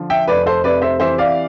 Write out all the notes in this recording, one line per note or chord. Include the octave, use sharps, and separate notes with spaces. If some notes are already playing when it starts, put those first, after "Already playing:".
Already playing: D3 F3
E5 G5
F1 B4 D5
A4 C5
C3 B4 D5
C5 E5
E3 C5 E5
D5 F5